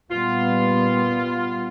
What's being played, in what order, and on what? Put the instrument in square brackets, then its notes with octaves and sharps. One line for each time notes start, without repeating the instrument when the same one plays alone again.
[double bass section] A#2 G3 B3 [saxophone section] F4